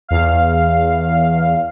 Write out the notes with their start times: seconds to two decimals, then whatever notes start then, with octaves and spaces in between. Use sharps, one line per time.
0.09 E2 F5